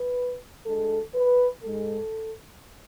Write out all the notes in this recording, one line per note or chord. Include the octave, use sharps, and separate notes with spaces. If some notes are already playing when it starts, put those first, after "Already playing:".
Already playing: B4
D2 D3 G#3 A4
B4
G#2 G#3 A4